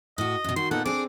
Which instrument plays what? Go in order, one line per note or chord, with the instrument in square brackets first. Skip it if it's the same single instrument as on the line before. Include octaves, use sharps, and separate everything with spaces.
[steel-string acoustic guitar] A2 F#4 [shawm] D#5
[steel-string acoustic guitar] F#2 B2
[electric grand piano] D#3 [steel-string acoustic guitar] F#4 [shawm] C6
[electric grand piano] A#2 B3 D#4 [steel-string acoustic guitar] A4 [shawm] F#5
[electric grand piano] C4 [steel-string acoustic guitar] D4 G#4 [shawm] D6